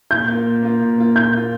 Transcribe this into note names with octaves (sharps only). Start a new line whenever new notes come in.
A#2 G6
A#3 F4
A#2
A#3 F4
A#2
A#3 F4
A#2 G6
A#3 F4